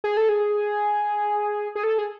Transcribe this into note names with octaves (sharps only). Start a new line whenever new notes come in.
G#4
A4
G#4
G#4
A4
G#4